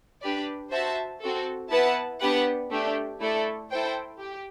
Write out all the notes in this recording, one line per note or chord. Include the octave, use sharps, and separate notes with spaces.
D4 G4 B4 D5
F#4 C5 E5 A5
C4 F#4 A4
B3 E4 B4 F#5 A5
B3 D4 G4 B4 F#5
A3 D4 G4
A3 E4 A4 D5
E4 A4 C5 G5
G4